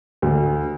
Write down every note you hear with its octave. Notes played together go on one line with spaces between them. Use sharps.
D2